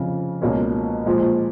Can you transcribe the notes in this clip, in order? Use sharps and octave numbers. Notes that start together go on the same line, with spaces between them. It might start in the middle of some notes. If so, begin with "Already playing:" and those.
Already playing: F1 F2 C#3
C#2 B2 A#3 C#4
A#2 F3 G#3